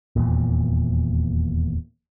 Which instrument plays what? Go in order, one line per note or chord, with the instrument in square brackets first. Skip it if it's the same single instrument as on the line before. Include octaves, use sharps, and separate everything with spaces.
[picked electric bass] D#1 G#1 E2 A#2